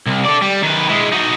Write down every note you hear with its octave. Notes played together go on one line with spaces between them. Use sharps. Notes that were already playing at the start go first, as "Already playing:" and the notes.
C2
A4 D5
G3
D#3 B4
G#3 E4
D#4 F#4